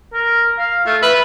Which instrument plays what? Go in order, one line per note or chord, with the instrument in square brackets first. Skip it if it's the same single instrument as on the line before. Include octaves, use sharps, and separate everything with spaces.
[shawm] A#4
F5
[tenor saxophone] A3 [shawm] F4
[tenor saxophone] B4 [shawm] E5